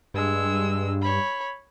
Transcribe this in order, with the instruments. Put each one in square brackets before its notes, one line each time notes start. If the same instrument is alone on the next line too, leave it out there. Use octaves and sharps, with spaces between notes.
[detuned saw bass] G2 [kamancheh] G#3 E6
[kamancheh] C#5 B5